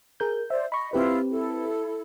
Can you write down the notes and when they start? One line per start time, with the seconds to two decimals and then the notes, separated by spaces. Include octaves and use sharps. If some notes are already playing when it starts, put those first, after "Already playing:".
0.20 G#4 A#4 G6
0.50 C5 D5 E5
0.72 D#5 B5 C#6
0.93 C4 E4 F4 G4 B4
1.30 E4 A4